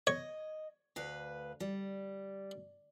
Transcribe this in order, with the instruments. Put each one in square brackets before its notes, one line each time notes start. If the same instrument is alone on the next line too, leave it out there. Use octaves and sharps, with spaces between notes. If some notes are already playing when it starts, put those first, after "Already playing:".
[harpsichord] C#5 [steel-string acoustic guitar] D#5
[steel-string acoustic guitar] D2 B4 F5
G3